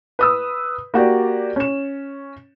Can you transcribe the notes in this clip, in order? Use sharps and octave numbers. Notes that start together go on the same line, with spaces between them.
B4 D#6 E6
A#3 F#4 G4 D5
C#4 E7